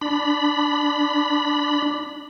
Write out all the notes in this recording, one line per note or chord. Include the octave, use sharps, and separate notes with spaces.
D4 B5